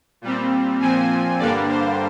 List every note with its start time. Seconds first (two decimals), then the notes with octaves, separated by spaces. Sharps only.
0.21 A#2 G3 C4
0.80 A#2 F3 C4 G#5
1.39 G2 D3 G3 A#3 D4 D5
1.69 C5